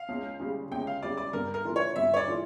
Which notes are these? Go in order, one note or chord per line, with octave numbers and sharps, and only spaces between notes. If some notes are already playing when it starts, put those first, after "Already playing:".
Already playing: F5
C#2
C#3 G3
C#2 G5
F5
C#3 G3 D5
D5
G2 A#4
A#4
E3 A3 D4 F4
C#5
G2 E5
C#5
D5
E3 A3 D4 F4